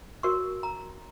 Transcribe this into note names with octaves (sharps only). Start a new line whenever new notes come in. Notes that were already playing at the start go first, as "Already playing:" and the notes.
F#4 A#4 C#5 C#6
A#5